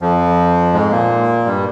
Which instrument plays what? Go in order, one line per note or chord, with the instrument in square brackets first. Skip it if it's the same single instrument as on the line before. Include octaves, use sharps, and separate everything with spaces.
[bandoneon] F2 F3
G#2 G#3
A#2 A#3
G2 G3